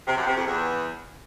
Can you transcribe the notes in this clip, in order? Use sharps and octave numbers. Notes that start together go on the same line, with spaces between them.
C3
F#2
C3
F2
E2